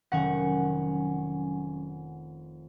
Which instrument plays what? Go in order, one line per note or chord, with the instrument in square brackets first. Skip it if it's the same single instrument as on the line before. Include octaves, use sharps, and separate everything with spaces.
[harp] F1 D#3 F#5 [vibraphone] F#3 C#4 G#5